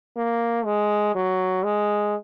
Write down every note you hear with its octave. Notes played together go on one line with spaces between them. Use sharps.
A#3
G#3
F#3
G#3